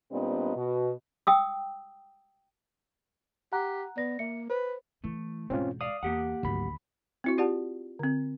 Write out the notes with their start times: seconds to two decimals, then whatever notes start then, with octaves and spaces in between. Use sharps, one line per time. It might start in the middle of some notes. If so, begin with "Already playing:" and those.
0.12 A#2 G3 B3 C4 D4 D#5
0.56 B2
1.27 G5 D#6 E6
3.52 G4 F#5 A#5 F#6
3.97 B3 D5 A#6
4.19 A#3 E5 C#7
4.50 B4 C5
5.04 E3 A3 E4
5.50 E1 G#2 C4 C#4 F4
5.81 D5 F5 D#6
6.03 E2 A#3 G4 F#5
6.43 G#1 D2 F#3 B5
7.24 C4 E4 F#4
7.38 F4 G4 D5 F#5 A5
7.99 D3 C4